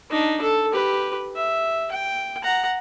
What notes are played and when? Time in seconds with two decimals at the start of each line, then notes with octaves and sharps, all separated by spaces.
0.11 D4 D#4
0.42 A4
0.72 G4 B4
1.35 E5
1.91 G5
2.43 F#5 A#5